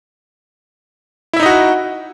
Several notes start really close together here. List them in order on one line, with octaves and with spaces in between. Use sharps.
E4 E5 D#4 D#5 F#4